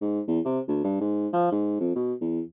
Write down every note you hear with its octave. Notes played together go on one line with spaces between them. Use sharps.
G#2
E2
C3
D2
G2
G#2
F3
G#2
F2
B2
E2